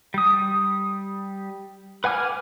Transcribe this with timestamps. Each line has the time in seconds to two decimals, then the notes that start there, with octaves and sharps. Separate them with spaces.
0.14 G3 D#6
2.04 B4 F#5 G#5 D6 F6